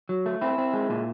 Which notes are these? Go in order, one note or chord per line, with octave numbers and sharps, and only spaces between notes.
F#3
A3
C4 E4
C4
G#3
A#2